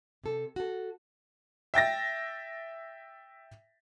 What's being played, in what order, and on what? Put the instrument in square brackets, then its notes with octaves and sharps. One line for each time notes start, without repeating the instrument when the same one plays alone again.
[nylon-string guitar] C3 A4
F#4 A4
[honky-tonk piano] E5 G5 A6 A#6